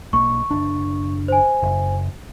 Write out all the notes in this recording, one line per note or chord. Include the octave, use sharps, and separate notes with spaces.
B1 A#3 C#6
F#1 D4
C5 G#5
F#1